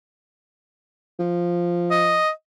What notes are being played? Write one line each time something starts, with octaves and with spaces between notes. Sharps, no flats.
F3
D#5